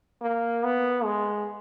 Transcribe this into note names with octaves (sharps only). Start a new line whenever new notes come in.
A#3
B3
G#3